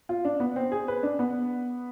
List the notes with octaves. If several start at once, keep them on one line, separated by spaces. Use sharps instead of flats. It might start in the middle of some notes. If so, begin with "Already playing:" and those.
F4
D4
B3
C4
G#4
B4
D4
B3